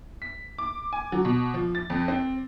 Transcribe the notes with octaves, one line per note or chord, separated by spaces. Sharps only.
B6
D6
G#5
F#3
B2
F3
A6
F2
C4